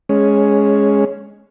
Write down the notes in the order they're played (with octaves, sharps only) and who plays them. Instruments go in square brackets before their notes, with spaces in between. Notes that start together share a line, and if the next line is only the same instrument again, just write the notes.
[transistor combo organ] G#3 C#4